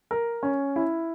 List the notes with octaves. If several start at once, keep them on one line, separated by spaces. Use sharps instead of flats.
A#4
C#4
E4